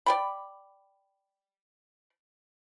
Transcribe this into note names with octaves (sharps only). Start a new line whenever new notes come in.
D5 G5 B5